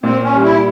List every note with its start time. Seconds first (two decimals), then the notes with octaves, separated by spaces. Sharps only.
0.03 A#2 C4
0.23 C#4
0.34 G3
0.44 E4